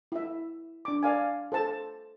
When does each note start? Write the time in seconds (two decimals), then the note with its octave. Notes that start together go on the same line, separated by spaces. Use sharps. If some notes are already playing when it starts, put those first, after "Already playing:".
0.12 E4 E5
0.85 D4 D6
1.03 D5 F5 G#5
1.52 A4 C5 A5